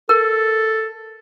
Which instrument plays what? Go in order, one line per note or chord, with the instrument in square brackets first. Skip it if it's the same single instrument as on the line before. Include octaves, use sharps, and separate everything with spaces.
[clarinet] A4 [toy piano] A#4